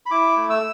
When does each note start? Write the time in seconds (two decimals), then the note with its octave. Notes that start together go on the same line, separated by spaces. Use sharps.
0.06 B5
0.11 E4 D6
0.36 A3
0.50 E6